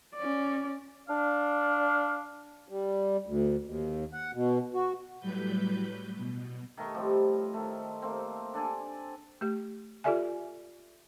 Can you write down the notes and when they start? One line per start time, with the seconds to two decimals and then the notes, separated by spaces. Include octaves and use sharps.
0.15 C#4 D5
1.09 D4 F5
2.69 G3
3.26 D2
3.65 D#2
4.13 F#5
4.33 B2
4.74 F#4
5.20 A2 F#3 G3 B4 G6
6.17 B2
6.77 D#3 A3 D#5 C#6
6.94 A2 F3 G3 C4
7.54 D#3 A3
8.02 A3 A#3 C4
8.54 D4 A4 D5 G#5
9.41 A3 G4
10.04 F4 G4 A4 D5 E5 G#5